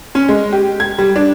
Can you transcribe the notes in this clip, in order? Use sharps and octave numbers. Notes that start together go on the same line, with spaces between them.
C#4
G#3
G4
G#6
G3
D4